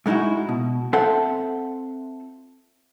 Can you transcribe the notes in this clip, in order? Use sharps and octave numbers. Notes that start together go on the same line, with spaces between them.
G#2 G#3 D#4 E4 F#4
B2
C4 F4 A4 C5 E5 F#5